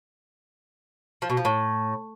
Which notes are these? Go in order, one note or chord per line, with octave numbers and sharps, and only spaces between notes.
F3
B2
F3
A2